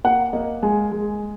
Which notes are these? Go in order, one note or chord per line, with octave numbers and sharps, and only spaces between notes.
A#3 F#5
A#3 D#5
G#3 G#5
G#3